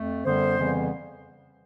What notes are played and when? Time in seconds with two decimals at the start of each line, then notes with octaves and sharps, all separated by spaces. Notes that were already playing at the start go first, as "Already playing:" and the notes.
Already playing: F2 A3
0.24 F#2 D3 G3 B3 C5
0.57 F2 C#3 E3 G3 B3